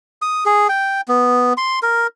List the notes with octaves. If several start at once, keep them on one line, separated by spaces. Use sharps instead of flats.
D#6
G#4
G5
B3
C6
A#4